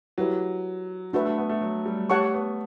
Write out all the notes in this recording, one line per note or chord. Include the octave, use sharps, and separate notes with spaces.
F#3 E4 G4 B4
A3 D4 F#4 B4 E5
A3
B3
A3
F#3
G3
A3 G4 C#5 F#5 A5 C#6
B3